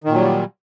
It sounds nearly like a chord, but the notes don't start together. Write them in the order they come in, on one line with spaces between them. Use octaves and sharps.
D#3 A#2 F#3 G3